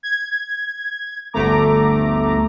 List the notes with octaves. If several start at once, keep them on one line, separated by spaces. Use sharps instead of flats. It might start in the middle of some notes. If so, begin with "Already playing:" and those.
G#6
G1 D2 A3 A#5 D6